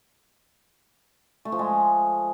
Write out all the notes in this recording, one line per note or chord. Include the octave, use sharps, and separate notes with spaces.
A3
F3
G#3